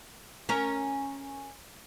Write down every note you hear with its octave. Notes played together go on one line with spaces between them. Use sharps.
C#4 A#4